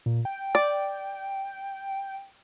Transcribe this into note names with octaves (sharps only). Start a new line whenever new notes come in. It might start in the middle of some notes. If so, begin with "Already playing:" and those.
A#2
G5
D5